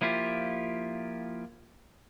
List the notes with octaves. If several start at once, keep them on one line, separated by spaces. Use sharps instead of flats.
F3 A#3 E4 F4 G4